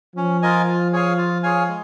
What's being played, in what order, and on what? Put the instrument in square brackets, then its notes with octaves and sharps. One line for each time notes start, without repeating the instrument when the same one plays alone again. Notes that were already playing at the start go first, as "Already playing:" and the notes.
[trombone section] F3 [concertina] C#4
[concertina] F4 A#4 D#5 G#5
F4
G#4 C#5 F5 G#5
F4
G#4 C#5 F5 G#5
G#3